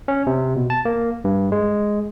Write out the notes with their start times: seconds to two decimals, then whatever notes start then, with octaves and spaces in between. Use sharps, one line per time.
0.08 C#4
0.27 C3
0.56 B2
0.70 A5
0.85 A#3
1.24 G2
1.52 G#3